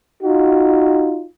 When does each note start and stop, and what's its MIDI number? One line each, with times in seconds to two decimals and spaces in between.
0.23 1.24 63
0.23 1.24 65
0.23 1.24 66